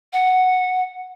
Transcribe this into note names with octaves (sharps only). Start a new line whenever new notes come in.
F#5